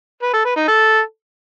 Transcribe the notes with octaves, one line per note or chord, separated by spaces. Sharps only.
B4
A4
B4
D#4
A4